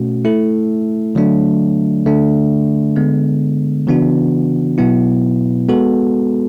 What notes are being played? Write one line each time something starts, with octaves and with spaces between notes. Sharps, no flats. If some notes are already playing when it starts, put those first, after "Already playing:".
Already playing: B2 A3 C#4 F#4
A3 E4 A4
D3 F#3 A3 D4
D3 A3 D4
D3 G#3 B3
C#3 E3 B3 D4 F#4
B2 F#3 B3 E4
G#3 B3 F#4 A4